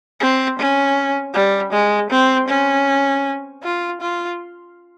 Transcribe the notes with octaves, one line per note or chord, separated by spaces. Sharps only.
C4
C#4
G3
G#3
C4
C#4
F4
F4